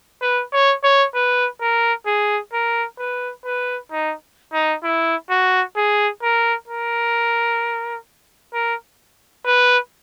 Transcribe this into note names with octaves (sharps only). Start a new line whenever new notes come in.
B4
C#5
C#5
B4
A#4
G#4
A#4
B4
B4
D#4
D#4
E4
F#4
G#4
A#4
A#4
A#4
B4